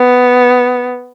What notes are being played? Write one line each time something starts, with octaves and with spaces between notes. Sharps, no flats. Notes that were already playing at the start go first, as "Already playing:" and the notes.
Already playing: B3